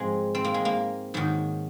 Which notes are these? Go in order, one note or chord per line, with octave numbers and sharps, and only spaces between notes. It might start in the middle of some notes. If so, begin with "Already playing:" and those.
Already playing: G#2 F3 G#3 C4
C4
A#3
G#3
A#3
G#2 D#3 F#3